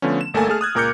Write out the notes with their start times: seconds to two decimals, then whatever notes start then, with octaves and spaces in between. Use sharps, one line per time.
0.02 D3 F3 A3 B3 C#4
0.21 E7
0.34 G1 A3 A#3 A4 G#5 A6
0.48 A3 G#4 F6
0.61 D#6 F#6 G#6
0.75 C#2 A#2 A#4 D6 G6 C#7